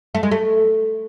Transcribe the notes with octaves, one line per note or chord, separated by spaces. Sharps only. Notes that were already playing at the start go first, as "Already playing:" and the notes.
A3
G#3
A3